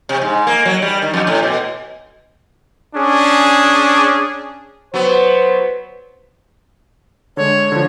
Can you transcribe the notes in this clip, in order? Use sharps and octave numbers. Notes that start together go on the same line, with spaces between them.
C3
G#2
A#3
F#3
G3
D#3
F2
A2
B2
C#4 D4 G#4
F#3 B3 C5
D3 G#3 C#5
D3 F3